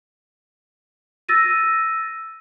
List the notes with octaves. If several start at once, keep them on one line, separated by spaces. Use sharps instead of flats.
E6 A6 A#6 D#7